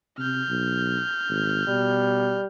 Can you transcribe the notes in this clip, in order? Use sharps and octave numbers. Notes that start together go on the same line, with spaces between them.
C3 F6 G6
B1
G#1
B2 G3